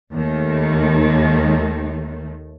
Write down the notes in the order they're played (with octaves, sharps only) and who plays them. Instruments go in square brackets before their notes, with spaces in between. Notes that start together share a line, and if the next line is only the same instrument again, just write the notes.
[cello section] D#2 D#3 A3